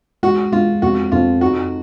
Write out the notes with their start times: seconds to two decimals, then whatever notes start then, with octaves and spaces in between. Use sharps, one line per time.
0.23 G#3 F#4
0.52 G#3 F4
0.82 F2 F#4
1.12 F2 F4
1.41 D#4 F#4